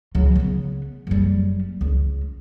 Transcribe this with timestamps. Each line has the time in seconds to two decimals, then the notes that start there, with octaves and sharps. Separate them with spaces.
0.15 C#2 F#3
0.36 C#3 B3
1.07 F#1 G3
1.81 C#2